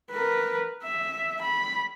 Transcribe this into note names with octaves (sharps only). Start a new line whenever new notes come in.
A#4 B4
E5
B5